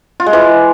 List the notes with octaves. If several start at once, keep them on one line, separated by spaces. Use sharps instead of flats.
F4
G#3
E3